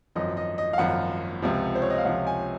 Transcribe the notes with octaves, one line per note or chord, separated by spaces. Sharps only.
G#1 F#2 F3 D#5
D#5
D#5
F5
G#1 F#2 F3 F#5
C#2 C3 F3
C5
C#5
D#5
F5
C#2 C3 F3 F#5
G#5